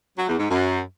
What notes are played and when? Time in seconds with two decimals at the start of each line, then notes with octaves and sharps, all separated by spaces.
0.17 F#3
0.28 E2
0.39 G#2
0.49 F#2